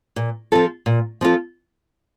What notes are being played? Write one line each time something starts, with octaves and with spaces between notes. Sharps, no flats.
A#2
F3 C4 F4 A4
A#2
F3 C4 F4 A4